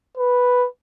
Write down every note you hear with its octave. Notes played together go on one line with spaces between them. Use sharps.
B4